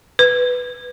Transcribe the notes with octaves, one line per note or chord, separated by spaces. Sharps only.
B4